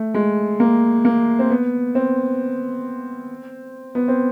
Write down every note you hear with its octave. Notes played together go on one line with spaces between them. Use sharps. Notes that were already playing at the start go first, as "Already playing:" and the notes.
Already playing: A3
G#3
A#3
A#3
C4
B3
C4
B3
C4